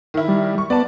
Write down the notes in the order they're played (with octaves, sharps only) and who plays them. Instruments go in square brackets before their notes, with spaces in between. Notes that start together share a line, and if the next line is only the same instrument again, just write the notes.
[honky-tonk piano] D#3 E4
[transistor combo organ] G3
[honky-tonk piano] C#6
[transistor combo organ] B3 [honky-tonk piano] D5 A5